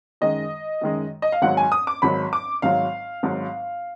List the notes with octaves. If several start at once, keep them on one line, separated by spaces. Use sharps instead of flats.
F#2 D#3 G#3 D#5
F#2 D#3 G#3
D#5
F5
G#1 G#2 F#3 F#5
G#5
D#6
D6
G#1 G#2 F#3 B5
D6
G#1 G#2 F#3 F5
G#1 G#2 F#3